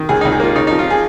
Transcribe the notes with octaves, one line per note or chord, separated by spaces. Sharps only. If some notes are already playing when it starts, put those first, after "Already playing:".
Already playing: D#3
C#2 G#4
D#4
C#2
G#4
A#3 F4
C#3 D#4
D#4
F3
F4
G#4